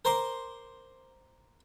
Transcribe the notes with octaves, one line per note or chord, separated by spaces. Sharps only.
A#4 C5 A#5 C6 D6